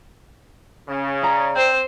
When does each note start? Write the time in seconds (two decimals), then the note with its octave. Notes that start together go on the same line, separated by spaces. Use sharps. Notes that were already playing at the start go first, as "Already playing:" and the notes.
0.88 C#3
1.22 D5 A#5
1.56 C4 C5